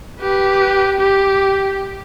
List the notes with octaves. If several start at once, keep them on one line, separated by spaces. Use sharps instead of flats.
G4 B4
G4